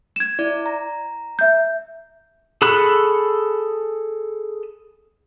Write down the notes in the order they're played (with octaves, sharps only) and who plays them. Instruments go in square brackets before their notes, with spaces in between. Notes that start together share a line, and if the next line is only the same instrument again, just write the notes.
[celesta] G#6 E7
[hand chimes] E4 D5
A#5
[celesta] E5 G6
[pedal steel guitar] G#4 A4 B5 C#6 F#6